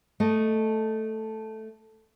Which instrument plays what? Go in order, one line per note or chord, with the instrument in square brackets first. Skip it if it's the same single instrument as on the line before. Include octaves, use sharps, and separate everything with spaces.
[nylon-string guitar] A3 D#5